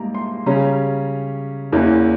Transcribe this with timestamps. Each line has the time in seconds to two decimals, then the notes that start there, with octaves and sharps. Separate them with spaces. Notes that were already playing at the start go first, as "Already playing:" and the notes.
Already playing: G#2 G3 A#3 A#5
0.15 C6
0.46 C#3 G3 C#4 A#5
1.72 E2 E3 A#3 C#4